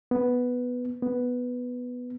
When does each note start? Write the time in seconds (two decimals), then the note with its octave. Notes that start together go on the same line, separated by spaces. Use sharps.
0.11 B3
1.02 B3